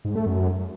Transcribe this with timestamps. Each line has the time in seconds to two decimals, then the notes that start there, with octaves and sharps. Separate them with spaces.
0.05 G#2
0.16 A3
0.26 F#2